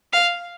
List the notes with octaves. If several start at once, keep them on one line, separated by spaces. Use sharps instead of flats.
F5